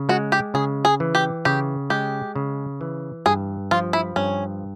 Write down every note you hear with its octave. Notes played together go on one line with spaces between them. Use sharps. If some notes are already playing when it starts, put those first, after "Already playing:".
Already playing: C#3
G#3 F#4
G4
C#3 G#4
G#4
E3
G4
C#3 G4
G#3 G4
C#3
E3
G2 G#4
F3 F4
E4
G2 C#4